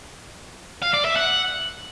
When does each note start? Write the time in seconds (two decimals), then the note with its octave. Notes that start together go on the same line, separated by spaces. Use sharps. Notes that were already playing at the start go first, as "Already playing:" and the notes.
0.83 F5
0.94 D5
1.05 E5
1.17 F#5